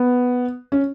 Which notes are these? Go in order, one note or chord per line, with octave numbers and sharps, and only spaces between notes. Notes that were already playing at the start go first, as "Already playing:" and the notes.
Already playing: B3
C#4